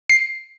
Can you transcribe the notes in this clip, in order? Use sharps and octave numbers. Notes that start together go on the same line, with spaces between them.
C7